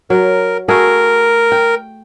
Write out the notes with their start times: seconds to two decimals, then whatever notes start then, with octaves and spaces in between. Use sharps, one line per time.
0.10 F#3 A#4
0.68 A3 F#4 G#4 A#4
1.52 G5